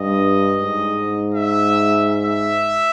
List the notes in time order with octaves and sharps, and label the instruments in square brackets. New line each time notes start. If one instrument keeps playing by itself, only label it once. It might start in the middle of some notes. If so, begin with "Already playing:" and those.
Already playing: [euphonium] G2 [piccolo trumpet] D#5
[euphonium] G#2
[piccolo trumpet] E5
E5